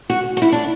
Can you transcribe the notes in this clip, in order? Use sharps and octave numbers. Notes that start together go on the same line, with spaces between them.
F#4
F#4
E4
D4